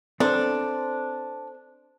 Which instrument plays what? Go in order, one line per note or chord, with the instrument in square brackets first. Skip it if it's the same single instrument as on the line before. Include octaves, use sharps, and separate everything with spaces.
[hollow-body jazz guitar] C4 A4 C5 [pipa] D4